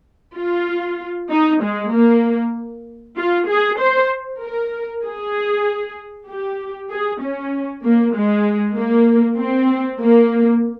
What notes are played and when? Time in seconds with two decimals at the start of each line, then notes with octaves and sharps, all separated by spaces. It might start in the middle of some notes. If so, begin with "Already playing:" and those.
0.38 F4
1.30 D#4
1.63 G#3
1.93 A#3
3.17 F4
3.49 G#4
3.79 C5
4.42 A#4
5.04 G#4
6.29 G4
6.91 G#4
7.21 C#4
7.84 A#3
8.15 G#3
8.76 A#3
9.39 C4
10.01 A#3